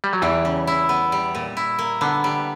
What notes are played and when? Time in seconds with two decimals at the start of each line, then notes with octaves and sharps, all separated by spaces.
0.04 G3
0.13 F#3
0.22 E2 E3 G3
0.45 C#3
0.67 E4
0.89 B3
1.12 G3
1.35 A#2
1.57 E4
1.79 A#3
2.01 D3 B3
2.24 G3